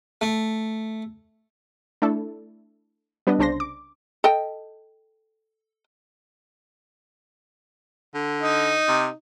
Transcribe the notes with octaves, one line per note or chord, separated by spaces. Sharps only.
A3
A3 D4 E4 A4
G3 B3 D4 B4 D#5
C2 C#3 D4 C5 C6 A#6
D6
A4 D#5 G5
D3
D#4
C3